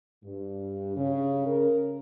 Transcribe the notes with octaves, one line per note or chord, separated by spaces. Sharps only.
G2
C#3
A#4